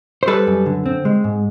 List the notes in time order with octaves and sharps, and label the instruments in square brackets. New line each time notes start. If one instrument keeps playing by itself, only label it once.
[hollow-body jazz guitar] C5
G3 A4 B4
F#2
D3
C4
G#3
G#2